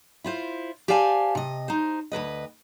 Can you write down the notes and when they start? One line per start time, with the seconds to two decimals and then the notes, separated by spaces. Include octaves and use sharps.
0.24 E4 F4 C5
0.88 G4 C5 D5 F5 G#5 A5
1.35 C3 D#5
1.68 D#4 C5
2.12 D2 C#3 B4 D#5